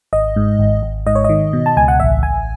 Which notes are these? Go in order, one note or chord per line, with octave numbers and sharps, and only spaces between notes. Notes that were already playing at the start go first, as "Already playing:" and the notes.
G#1 D#5
G#2
G#1
G#1
G#2 D#5
C#5
D#3 D#5
B2
A5
C#2 G#5
F#5
A1 E5
A1 G#5